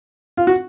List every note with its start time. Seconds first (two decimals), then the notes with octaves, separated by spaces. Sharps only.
0.37 F4
0.47 F#4